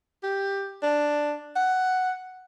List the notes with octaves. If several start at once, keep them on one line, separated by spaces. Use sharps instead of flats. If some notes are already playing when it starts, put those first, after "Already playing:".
G4
D4
F#5